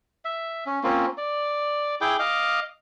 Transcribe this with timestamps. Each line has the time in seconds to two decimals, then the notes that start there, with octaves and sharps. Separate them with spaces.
0.25 E5
0.66 C#4
0.84 A#3 C4 C#4 F4
1.18 D5
2.01 E4 G#4 G5 D6
2.19 D#5 F5 D6